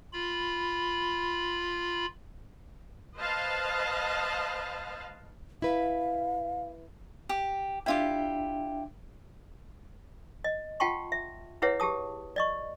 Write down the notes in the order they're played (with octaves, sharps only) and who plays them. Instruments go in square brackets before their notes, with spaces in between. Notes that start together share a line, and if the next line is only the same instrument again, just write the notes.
[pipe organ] F4 B5
[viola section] B4 C5 D#5 F5 A5
[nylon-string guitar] E4 B4 [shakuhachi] F5
[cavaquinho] G4
[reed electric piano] D4 E5 G5 [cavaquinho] E4 F4 G4
[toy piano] D#5
F4 F#5 G5 A5 C6 C#6
E5
E4 G#4 B4 C#5 E5 F#5
G4 G#4 A5 D#6
D5 D#5 C#6